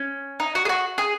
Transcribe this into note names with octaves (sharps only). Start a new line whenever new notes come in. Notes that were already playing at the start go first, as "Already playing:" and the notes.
Already playing: C#4
D#4
F#4
G#4
F#4
G#4